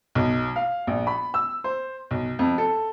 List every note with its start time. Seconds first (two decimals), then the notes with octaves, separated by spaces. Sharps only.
0.15 B1
0.56 F5
0.87 A#1
1.07 B5
1.34 E6
1.64 C5
2.11 B1
2.39 F2
2.58 A4